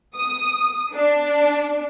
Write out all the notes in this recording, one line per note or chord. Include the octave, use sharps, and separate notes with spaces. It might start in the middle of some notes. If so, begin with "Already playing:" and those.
D#6
D4